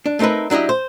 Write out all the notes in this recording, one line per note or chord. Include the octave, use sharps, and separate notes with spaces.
D4
A3 C4 D#4 A#4 B4
F#3 D4 E4 G4 D#5
C5